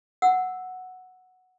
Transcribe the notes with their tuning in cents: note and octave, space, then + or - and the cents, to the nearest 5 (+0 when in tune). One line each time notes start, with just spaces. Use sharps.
F#5 +0 E6 -5